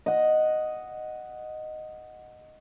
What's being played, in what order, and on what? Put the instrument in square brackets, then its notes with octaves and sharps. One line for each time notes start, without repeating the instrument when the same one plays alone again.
[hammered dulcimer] D#5 F#5